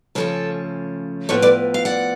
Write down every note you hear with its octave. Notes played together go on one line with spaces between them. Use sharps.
C#3 F3 A3 C#4 A4 C#5
A2 F3 B3 A4 C#5
B4 D5
F5
D5 F#5